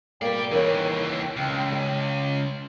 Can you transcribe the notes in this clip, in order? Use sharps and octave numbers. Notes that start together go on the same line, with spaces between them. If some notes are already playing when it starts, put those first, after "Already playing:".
B2 A#3 G4 D5 G5
D#2 E3 A#4 B4 C#5
C#2
D#5